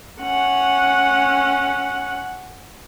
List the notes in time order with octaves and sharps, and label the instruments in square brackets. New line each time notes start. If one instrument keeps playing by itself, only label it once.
[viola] C#4 F#5